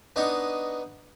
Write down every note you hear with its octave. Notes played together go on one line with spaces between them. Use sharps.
B3 D4 D#4 D#5 C#6 D#6